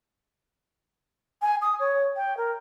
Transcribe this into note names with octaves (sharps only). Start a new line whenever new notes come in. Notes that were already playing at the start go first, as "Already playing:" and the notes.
G#5
D#6
C#5
G5
A#4